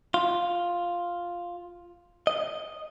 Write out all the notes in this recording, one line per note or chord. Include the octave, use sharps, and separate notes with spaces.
F4
D#5